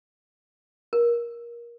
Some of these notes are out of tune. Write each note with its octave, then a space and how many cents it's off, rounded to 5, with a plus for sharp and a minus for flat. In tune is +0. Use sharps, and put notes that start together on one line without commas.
A#4 +20